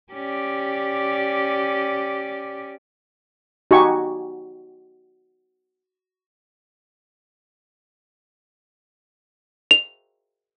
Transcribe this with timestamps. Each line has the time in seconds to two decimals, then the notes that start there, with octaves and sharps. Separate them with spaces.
0.13 C#4 G4 D5
3.71 D#4 F#4 G4 E5 G#5 C#6
9.71 F7